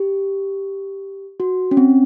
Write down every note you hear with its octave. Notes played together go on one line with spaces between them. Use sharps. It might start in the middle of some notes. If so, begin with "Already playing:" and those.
Already playing: G4
F#4
C#4
C4